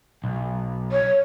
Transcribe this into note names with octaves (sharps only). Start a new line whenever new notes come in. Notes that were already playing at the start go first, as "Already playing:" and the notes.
B1
C#5